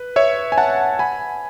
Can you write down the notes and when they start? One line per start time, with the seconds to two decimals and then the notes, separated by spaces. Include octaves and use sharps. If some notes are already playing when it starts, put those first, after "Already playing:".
Already playing: B4
0.16 C#5 E5
0.52 G#5
0.58 F#5 A5
0.99 G#5 B5